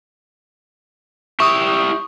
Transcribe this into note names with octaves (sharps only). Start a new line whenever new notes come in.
E4 G4 E5 C#6 D#6